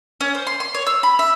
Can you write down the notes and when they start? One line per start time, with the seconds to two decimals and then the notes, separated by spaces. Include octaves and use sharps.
0.21 C#4
0.35 C5
0.47 C6
0.60 C6
0.75 C#5
0.87 E6
1.03 B5
1.19 E5